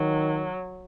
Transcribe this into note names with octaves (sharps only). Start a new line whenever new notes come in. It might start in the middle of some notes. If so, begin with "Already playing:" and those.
Already playing: D#3 F#3